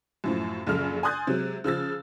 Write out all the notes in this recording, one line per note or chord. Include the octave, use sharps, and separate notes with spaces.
F#2 A2 F3
A#1 F#2 C#3 A4 F6
G#5 C6 D#6 F#6 G6 A6
C3 F#3 G#3
C#3 F3 E6 A6